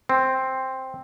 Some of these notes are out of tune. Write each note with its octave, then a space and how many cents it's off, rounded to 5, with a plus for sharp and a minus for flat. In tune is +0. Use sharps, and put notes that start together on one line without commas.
C4 +5